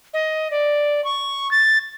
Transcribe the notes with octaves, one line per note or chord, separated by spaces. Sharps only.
D#5
D5
C#6
A6